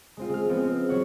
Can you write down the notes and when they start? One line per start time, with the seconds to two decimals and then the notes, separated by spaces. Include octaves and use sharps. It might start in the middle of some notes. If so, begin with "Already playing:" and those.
0.17 G#3 C4 F4
0.29 G#3 F6
0.49 F3 G#3 B3 C4
0.65 C4
0.89 F#3 C#5 F#5